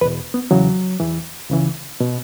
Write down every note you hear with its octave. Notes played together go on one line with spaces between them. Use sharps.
E2 B2 B4
B3
E2 C#3 E3 F#3
E2 E3
C#2 C#3 E3
B2